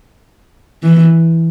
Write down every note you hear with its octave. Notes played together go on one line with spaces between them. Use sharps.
E3